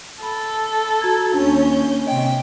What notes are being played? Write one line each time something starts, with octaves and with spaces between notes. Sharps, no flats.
A4 B5
F#4 A#5 G#6
D#2 C#4 D4 G6
C3 D#5 G5